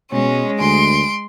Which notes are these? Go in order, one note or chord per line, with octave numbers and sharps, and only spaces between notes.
B2 G#3 C#4
D2 C6 D7